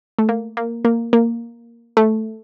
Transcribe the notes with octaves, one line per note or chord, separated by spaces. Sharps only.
A3
A#3
A#3
A#3
A#3
A3